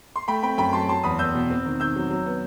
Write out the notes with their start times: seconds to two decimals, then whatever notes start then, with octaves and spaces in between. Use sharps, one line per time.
0.16 C6
0.28 A3 G5 B5
0.43 C4 G5 B5
0.58 F#2 G5 B5
0.73 F#3 A5 C6
0.88 F#3 A5 C6
1.03 E2 B5 D#6
1.19 E2 E6 G6
1.35 B2
1.50 C4
1.65 D#3
1.80 D#3 E6 G6
1.96 F#3
2.10 F#3
2.26 B3